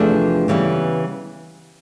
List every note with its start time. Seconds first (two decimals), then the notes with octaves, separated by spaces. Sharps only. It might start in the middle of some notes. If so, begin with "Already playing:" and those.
Already playing: E2 C3 F3 A3 D4 G#4
0.48 C#3 E3 G3 B3